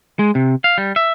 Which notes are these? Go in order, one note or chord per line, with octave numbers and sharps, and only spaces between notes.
G#3
C3
F5
G3
E5